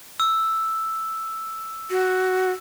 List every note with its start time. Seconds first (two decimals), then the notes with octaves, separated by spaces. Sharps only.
0.20 E6
1.91 F#4